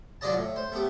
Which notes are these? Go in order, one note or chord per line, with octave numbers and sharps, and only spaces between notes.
D#2 F#3 F4 D5 D#5 A5
A2
C5
A3 B3 G4